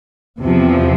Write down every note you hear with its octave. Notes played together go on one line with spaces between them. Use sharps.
E2 C3 F3